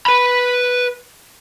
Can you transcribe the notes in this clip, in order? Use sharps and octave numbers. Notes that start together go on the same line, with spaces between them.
B4 B5